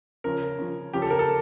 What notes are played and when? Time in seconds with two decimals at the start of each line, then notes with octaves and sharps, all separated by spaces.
0.24 C#3 F3 C#4 A#4
0.59 C#3 F3 C#4
0.93 C#3 F3 C#4 G4
1.02 A4
1.10 A#4
1.19 A4